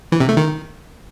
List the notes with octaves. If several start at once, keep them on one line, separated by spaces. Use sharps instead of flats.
E3
C3
A3
D#3